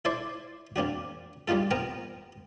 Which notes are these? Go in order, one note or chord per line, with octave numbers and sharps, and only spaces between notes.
E4 A4 C5 D5 C6
A#3 C4 D4 F#4
G3 A#3 D#4 F4 A4
B3 C4 A#4 G5 A#5